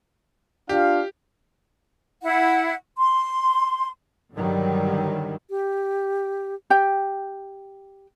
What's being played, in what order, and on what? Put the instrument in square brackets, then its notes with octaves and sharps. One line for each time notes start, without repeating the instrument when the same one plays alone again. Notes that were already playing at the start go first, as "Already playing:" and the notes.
[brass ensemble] D4 F4 F5 [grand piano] G4
[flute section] E4 F#5
C6
[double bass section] G2 D3 D#3 F#3 G3
[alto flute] G4
[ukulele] G4 G5